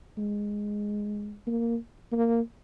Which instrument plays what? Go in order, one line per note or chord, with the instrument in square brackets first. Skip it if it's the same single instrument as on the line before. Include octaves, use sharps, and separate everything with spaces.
[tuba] G#3
A#3
A#3